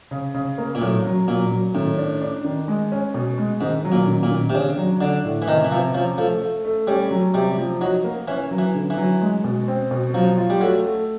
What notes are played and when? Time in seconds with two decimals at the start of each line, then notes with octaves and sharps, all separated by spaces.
0.11 C#3
0.34 C#3
0.58 A#3
0.75 A#2
0.81 A2 F#3
1.05 F#3
1.28 A#2 F#3
1.51 F#3
1.75 A2 D#3
1.98 D4
2.22 D4
2.44 D#3
2.68 G#3
2.92 C#4
3.14 B2
3.38 G#3
3.61 G#2 D#3
3.85 F#3
3.92 A#2
4.08 D#3
4.23 A#2
4.31 D#3
4.50 C3
4.54 C#3 D4
4.78 F#3
5.01 D3 D4
5.25 A2
5.42 E3
5.48 C3 D#3
5.64 E3
5.71 C3 F3
5.95 F3 C#4
6.18 F3 A3
6.41 A3
6.65 A3
6.87 G3 C#4
7.11 F#3
7.34 C3 G3
7.58 F3
7.81 F#3 D#4
8.04 A#3
8.28 E3 C#4
8.51 F#3
8.58 E3
8.74 D3
8.90 E3
8.97 F#3
9.21 G#3
9.44 B2
9.68 C4
9.91 B2
10.14 F3 F#3
10.38 F4
10.50 G3
10.61 F#3 A3
10.84 A3